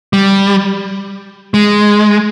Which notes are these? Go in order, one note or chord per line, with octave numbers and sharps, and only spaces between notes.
G3
G#3